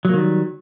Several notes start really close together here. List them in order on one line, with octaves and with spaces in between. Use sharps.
F#3 A#3 D#3 G3